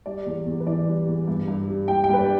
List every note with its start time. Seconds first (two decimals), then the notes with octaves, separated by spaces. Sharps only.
0.06 G3 D5
0.27 E2
0.47 E2
0.60 B4
0.67 E3 D5
0.88 G3
1.07 E2
1.27 G2
1.48 G2
1.68 G3
1.88 G3 G5
2.04 G5
2.09 G2 B4
2.19 D5